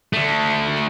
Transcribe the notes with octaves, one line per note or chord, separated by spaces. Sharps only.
D3 A3